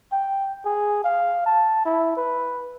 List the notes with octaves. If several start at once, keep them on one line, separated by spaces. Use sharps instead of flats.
G5
G#4
F5
A5
E4
B4